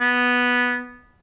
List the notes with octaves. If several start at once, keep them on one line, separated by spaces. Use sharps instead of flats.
B3